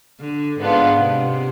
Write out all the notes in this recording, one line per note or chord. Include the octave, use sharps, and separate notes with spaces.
D3
G#2 B3 D4 F4
C3